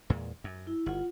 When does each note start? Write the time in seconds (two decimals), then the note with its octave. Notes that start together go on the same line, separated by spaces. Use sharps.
0.10 E2 A#2 G#3
0.44 F#2
0.67 E4
0.86 G1 F4 F#5